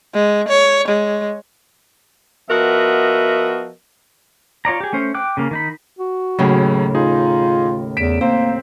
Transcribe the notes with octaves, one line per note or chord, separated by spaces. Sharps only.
G#3
C#5
G#3
F3 B3 F#4 A#4 D#5 E5
F4 C#5 D5 A#5
G4 G#4
A3 C#4 C5
G5 D6 F#6
C#3 A#3
D#3 D#4 B5
F#4
D#2 A2 C#3 F#3 G#4
D#4 F4 G#4
E2 B6 D7 E7
A#3 C4 C5